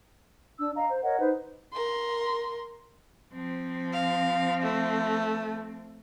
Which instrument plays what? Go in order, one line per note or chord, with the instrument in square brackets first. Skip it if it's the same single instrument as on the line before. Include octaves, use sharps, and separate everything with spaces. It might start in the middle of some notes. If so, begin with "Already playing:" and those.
[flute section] D4 E6
D#5 F5 A#5
C5
A#4 C#5 D#5 F#5
D#4 B4 C5
[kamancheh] A#4 C6
[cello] F3 C4
[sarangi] F5
A3